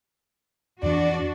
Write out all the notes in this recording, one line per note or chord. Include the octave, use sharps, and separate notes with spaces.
F2 E3 D4 F#4 D5